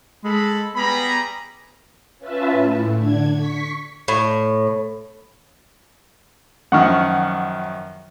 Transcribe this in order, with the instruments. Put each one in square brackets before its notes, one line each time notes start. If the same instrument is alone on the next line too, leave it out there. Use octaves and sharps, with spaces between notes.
[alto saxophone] G#3 [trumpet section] A4 B5
[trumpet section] G3 G#4 A#5 [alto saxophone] B3 [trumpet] B5
[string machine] C#4 F4 B4 E5 A5
A2
D3 D4 G#6
C#6 B6
[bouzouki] A2
[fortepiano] F#2 D#3 F3 [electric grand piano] F#5 C#6 F6